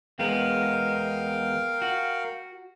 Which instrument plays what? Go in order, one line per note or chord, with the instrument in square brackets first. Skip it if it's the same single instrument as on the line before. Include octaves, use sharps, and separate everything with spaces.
[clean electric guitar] E2 G#3 B3 [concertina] A#4 F5 G5
[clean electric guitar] F#4